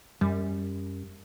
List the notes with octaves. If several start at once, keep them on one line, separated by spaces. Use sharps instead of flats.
F#2 G3